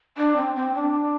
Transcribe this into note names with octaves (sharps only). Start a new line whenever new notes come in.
D4
C4
C4
D4